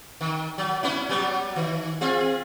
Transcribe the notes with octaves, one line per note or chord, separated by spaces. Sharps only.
D#3
F#3
B3 C#4 E4
F#3 G3 B3
D#3
C4 F4 G#4